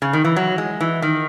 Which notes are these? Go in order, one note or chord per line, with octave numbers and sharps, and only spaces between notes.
C#3
D#3
E3
F#3
G#3
E3
D#3